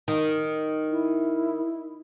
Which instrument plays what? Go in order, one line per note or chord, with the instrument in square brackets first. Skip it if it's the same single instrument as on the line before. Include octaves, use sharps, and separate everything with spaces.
[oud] D#3 [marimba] D#4
[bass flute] E4